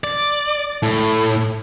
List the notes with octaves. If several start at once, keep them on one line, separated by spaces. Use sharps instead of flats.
D5
A2